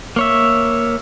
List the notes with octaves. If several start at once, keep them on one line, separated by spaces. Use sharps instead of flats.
A#3 C#5 E5